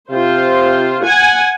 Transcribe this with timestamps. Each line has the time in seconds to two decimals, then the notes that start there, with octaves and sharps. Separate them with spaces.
0.11 C3 F4 C5
1.03 F#5 G#5